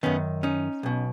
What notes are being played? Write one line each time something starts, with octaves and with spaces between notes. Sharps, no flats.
F#2 D#3 B3 C#4
C#4 D#4
B1 B2